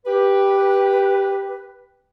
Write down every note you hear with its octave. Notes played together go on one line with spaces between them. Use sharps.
G4 B4